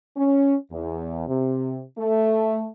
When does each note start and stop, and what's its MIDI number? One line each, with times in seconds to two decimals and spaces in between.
0.17 0.55 61
0.72 1.25 40
1.27 1.82 48
1.98 2.68 57